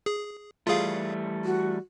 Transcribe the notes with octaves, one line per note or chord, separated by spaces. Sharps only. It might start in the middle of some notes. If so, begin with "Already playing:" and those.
G#4
E3 G3 A3 F4 G#4 F5
F#4